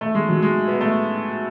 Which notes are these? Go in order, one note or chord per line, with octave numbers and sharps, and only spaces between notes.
A3
G#3
F#3
G#3
B3
A3